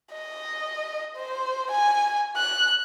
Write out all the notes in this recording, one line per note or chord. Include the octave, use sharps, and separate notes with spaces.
D#5
C5
G#5
F#6